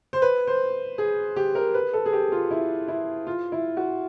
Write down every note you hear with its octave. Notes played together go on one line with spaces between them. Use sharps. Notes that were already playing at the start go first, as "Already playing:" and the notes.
C5
B4
C5
G#4
G4
A#4
B4
A4
G#4
G4
F4
E4
E4
F4
E4
F#4